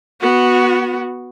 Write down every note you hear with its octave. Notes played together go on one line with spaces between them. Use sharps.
B3 F#4